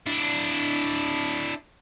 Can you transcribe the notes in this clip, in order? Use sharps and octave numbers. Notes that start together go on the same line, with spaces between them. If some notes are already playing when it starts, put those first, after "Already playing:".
D4 E4